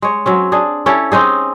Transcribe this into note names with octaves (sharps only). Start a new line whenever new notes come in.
G#3 C#5
F#3 C4 C#4
D4 G#4
C#4 E4 G4 A4
C4 C#4 D#4 G#4